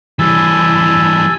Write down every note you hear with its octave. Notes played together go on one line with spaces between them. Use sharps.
E3 G3 G#5 A5 E6